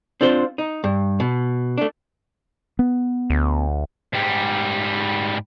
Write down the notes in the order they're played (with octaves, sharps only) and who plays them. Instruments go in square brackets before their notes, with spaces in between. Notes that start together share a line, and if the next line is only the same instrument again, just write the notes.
[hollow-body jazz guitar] C4 D4 F4 C5
D#4
G2
B2
A3 D4
[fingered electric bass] B3
[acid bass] D2
[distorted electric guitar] G#2 G3